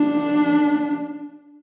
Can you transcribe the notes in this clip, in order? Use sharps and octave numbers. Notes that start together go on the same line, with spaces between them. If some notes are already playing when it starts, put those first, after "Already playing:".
Already playing: D4